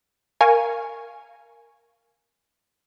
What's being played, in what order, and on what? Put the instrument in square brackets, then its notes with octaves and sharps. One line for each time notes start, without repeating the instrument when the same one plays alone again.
[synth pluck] A#4 F5 G#5 C#6